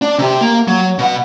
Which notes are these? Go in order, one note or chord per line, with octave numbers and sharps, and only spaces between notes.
D4
C3 G4
A#3
F#3
B2 F#5